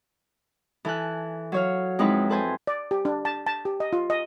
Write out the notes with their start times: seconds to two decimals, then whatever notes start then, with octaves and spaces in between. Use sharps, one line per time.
0.85 E3 A4 G#5 F#6
1.52 F#3 C#5 F5
1.99 F2 G#3 D#4 E4 B4
2.29 A4 B4 C5 G#5
2.67 D5
2.91 G4
3.05 D4
3.25 A5
3.47 A5
3.65 G4
3.80 D#5
3.93 F4
4.10 D#5